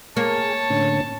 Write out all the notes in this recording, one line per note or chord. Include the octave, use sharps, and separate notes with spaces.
A#3 G#4 C#5 A5
A2 D3 C#4